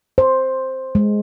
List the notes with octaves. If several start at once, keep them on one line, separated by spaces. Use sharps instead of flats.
C5
G#3